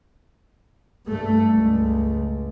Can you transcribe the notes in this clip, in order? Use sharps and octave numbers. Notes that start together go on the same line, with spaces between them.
G2 A3
C#2